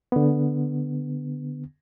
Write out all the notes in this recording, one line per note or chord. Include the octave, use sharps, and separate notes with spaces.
D3 B3